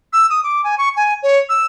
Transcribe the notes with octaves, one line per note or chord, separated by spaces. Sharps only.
E6
D#6
D6
G#5
C#6
G#5
C#5
E6